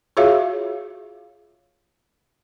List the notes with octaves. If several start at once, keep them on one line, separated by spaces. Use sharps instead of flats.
F4 F#4 G#4 C#5 E5 F5